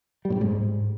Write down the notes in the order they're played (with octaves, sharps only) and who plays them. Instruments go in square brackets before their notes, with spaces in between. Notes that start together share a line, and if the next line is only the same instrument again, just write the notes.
[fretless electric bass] G3
A2
G2
G#2